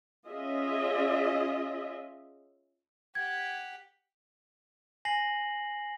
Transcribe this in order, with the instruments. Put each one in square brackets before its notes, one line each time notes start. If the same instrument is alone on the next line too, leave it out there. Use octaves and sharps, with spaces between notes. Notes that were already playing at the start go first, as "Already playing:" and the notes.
[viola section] C#4 F4 G#4 D#5 E5
[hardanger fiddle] G4 F#5 [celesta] G#6
[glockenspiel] G#5 A#6 C7 F#7